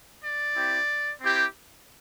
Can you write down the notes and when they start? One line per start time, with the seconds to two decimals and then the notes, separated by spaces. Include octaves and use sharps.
0.23 D5
0.56 C4 E4 G4
1.22 C4 E4 G4